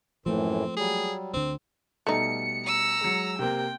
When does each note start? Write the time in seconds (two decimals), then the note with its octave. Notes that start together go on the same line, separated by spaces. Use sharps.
0.26 F#2 A2 E3 F3 A3 A#3 C4
0.77 F#3 G3 G#4
1.33 D2 D3 C4
2.07 B2 G3 A3 D#4 C#7
2.66 A#5 E6
3.01 F#3 G#3
3.39 C3 A#3 C4 G5